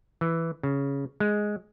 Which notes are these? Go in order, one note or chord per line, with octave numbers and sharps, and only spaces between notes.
E3
C#3
G#3